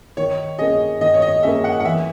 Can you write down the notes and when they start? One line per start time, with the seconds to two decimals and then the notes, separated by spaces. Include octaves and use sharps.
0.17 D#3 C#5
0.59 A#3 C#4 G#4 D#5
1.01 D#3 D#5
1.14 C#5
1.22 D#5
1.43 A#3 C#4 G#4 E5
1.64 F#5
1.80 F#5
1.85 E3 E5